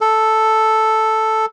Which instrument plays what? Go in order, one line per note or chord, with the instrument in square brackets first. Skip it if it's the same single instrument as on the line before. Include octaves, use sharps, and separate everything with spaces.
[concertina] A4